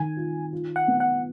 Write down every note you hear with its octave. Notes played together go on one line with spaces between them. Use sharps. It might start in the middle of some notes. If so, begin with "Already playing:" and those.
Already playing: D#3 G#5
F4
F4
F#5
B3
F#5